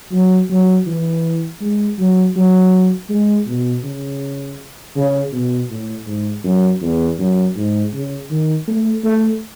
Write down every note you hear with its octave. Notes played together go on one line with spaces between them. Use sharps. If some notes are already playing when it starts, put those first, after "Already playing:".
F#3
F#3
E3
G#3
F#3
F#3
G#3
B2
C#3
C#3
B2
A2
G#2
F#2
E2
F#2
G#2
C#3
D#3
A3
A3